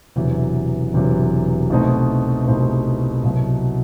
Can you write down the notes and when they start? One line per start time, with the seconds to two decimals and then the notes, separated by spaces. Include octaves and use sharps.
0.16 E1 E2 C3 F#3
0.93 E1 E2 C3 F#3
1.70 C2 B2 A3 C4 D#4
2.47 C2 B2 A3 C4 D#4
3.23 C2 B2 F#3